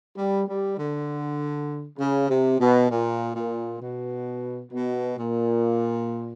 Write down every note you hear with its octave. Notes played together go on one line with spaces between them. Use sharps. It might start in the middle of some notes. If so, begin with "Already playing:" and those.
G3
G3
D3
C#3
C3
B2
A#2
A#2
B2
B2
A#2